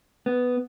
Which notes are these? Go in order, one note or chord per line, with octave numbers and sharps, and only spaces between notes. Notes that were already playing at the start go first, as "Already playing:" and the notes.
B3